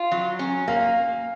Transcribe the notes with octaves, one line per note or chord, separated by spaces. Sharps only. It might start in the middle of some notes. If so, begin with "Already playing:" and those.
Already playing: F4
F#3
C#4
A#3 F5